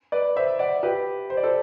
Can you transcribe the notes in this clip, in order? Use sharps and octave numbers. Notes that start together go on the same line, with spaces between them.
B4 D5
C5 E5
D5 F#5
G4 B4
C5
D5
A4 C5